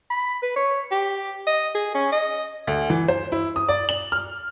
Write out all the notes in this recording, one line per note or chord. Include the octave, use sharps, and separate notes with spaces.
B5
B4
C#5
G4
D#5
G#4
C#4
D#5
D2
E3
C5
E4
D#6
D5
F#7
F6